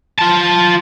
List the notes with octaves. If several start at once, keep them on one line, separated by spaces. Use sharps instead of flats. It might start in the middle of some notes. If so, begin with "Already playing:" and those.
F4 A5